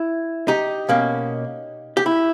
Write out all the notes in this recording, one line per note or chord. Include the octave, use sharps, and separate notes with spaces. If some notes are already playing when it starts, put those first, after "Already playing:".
Already playing: E4
D#4 G4
B2 A#3 C#4
G4
E4